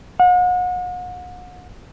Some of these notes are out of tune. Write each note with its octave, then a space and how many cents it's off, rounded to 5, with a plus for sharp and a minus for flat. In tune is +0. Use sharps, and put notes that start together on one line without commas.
F#5 -40